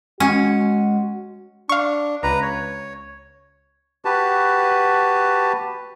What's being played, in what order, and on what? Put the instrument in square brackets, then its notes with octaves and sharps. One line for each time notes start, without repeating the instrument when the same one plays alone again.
[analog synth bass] G#3 [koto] C#4 [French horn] F#4
[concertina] D4 [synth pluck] F5 C#6
[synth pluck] C#2 [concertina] B4 A#5
[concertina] C#5
[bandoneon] F#4 G4 B4 A5